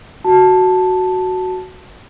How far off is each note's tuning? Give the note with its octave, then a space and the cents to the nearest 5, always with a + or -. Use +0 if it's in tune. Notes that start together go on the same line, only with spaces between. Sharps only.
F#4 +0 A5 +0